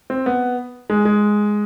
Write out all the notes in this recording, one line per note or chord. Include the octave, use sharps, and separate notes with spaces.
C4
B3
G#3
G#3